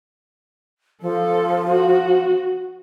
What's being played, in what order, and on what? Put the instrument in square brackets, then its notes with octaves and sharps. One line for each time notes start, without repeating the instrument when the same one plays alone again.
[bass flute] F3 [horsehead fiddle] A4
[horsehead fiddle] F#4